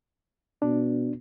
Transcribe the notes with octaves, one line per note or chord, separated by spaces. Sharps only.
B2 D4